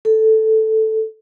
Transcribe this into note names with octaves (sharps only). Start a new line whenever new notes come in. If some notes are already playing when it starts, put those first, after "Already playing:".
A4